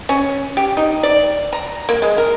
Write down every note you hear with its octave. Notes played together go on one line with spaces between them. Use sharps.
C#4
G4
D#4
D5
A#5
A#3
G#3
A#4